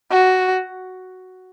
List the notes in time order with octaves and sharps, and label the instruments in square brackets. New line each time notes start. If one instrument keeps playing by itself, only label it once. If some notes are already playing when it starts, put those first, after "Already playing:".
[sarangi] F#4